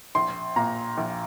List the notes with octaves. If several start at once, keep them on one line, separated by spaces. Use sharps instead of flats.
A#1 C6
A#2 A#5
A#1